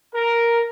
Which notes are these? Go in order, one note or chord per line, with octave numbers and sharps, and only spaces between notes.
A#4